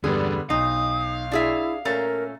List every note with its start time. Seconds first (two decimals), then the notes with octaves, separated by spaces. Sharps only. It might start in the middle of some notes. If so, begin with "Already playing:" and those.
0.04 E2 G2 D3 G3 B3 G#4 D5
0.50 B1 D#4 F5 D#6
1.32 D4 E4 G#4 E5
1.85 A#2 A3 C#4 A#4 A#5 A6